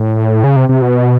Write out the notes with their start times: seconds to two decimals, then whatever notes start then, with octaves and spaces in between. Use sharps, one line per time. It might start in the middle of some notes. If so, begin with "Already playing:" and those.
Already playing: A2
0.44 C#3
0.56 C3
0.69 C3
0.82 B2